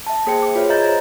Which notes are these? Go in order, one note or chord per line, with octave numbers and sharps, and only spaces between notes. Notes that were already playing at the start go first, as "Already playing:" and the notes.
E5 A5
A#3 G#4 C5 G5 C#7
D6
F4 F#4 G#4 B4 C#5 E5
D#5 E5 A#5 G6 A6
C5 A#5 G#6